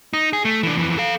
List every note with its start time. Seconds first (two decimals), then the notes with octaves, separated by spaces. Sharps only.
0.13 D#4
0.33 G#4
0.45 A3
0.63 E3 D4
0.77 F2 E3
0.98 A4 F5